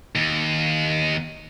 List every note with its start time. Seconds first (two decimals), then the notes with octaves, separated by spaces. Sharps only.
0.15 D#2